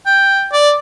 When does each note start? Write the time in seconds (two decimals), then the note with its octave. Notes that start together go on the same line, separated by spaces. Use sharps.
0.06 G5
0.53 D5